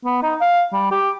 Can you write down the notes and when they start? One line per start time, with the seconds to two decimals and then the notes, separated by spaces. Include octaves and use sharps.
0.05 B3
0.22 D#4
0.41 F5
0.73 G3
0.91 G4